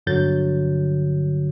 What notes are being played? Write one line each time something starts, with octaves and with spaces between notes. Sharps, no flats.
G1 G2 D3 F#3 G6 A6